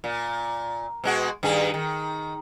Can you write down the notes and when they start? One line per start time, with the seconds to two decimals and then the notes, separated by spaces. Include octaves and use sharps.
0.04 A#2
1.04 B2 G#3 F#4
1.43 G2 D#3 G#4
1.74 D#3